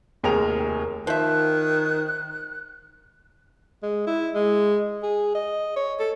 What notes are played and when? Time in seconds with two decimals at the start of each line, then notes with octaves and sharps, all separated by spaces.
0.23 F1 D#2 G#4 A#4 F7
1.07 D#3 F3 E5 F#6
3.83 G#3
4.07 E4
4.35 G#3
5.03 G#4
5.35 D#5
5.76 C#5
5.99 A4